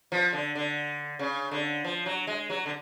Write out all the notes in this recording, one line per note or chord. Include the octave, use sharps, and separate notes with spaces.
F3
D3
D3
C#3
D3
F3
F#3
G#3
F#3
D3